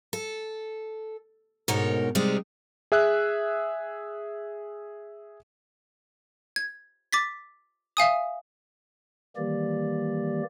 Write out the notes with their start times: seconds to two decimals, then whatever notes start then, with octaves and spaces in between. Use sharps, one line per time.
0.13 A4
1.68 D2 G#2 B2 D#4 A#4 C#5
2.15 C3 G3 G#3 C4 D#4 G4
2.92 G#4 E5 E6 F#6
6.56 G#6
7.13 D6 A6 B6
7.97 E5 F5 G#5 D#6
9.37 D#3 E3 G3 A#3 G4 D5